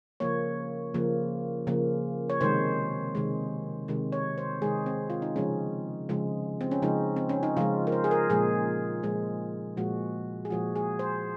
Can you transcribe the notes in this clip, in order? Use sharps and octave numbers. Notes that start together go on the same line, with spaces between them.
C#3 F3 A#3 C#5
C#3 F3 A#3
C#3 F3 A#3
C#5
C3 D#3 G#3 C5
C3 D#3 G#3
C3 D#3 G#3
C#5
C5
C3 D#3 G#3 G#4
C4
F4
D#4
C#3 F3 G#3 C#4
C#3 F3 G#3
C4
C#4
C#3 F3 G#3 D#4
C4
C#4
D#4
C#3 F3 G#3 F4
A#4
C5
G#4
A#4
A#2 F3 G#3 G#4
A#2 F3 G#3
A#2 F3 G#3 F#4
G#4
A#2 F3 G#3 F#4
G#4
C5